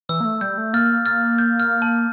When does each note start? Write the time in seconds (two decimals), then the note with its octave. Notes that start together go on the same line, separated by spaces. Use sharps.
0.09 E3 E6
0.20 A#3
0.25 A3
0.41 G3 G6
0.58 A3
0.73 A#3 F6 A6
1.06 F6 A6
1.38 G6
1.60 F6
1.82 A5